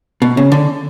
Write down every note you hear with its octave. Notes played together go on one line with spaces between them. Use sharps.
B2
C#3
D3